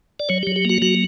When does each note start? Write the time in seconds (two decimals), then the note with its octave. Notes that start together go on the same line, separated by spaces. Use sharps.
0.20 D5
0.29 F#3 C#5
0.43 F#3 G4
0.56 G4
0.65 A#3 F#4
0.82 F#3 F#4